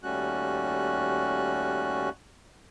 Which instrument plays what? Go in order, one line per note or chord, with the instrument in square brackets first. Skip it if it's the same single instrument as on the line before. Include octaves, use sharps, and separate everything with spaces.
[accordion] D#2 G3 A3 C#4 F#4 F#6